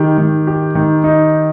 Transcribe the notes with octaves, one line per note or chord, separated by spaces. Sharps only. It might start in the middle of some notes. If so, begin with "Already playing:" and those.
Already playing: D#3 G4
D#3
G4
D#3
D#4